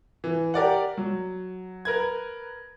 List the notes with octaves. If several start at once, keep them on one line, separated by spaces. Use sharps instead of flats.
E3
G4 A#4 D5 F#5
F#3
A#4 B4 G#6